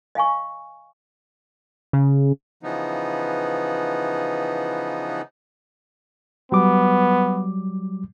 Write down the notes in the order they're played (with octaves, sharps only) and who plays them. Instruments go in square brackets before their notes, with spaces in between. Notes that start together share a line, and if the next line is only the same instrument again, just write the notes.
[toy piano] D#5 F5 G#5 C#6
[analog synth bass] C#3
[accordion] C#3 E3 F3 B3 D#4
[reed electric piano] F#3 G3 D6 [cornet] B3